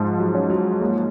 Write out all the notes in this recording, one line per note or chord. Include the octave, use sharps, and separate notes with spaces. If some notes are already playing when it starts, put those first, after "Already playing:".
Already playing: G#2 F3 G#3
F#3
C#4
F#3
G#3 A#3